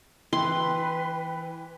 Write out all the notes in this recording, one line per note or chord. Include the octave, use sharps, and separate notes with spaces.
E3 B4 G5 C6